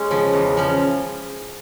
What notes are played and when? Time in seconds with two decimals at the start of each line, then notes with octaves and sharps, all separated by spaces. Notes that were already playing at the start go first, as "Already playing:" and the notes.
Already playing: G#3 C#4
0.10 C#3 F3
0.33 E2
0.57 C#3 F3